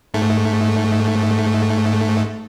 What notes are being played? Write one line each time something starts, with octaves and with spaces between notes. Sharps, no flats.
G#2 A3